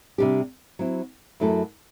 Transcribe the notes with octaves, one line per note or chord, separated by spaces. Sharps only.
C3 G3 D4 G4
F#3 C4 E4
F#2 F#3 A3 E4 A4